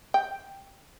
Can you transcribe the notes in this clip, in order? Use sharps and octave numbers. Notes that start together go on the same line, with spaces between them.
G5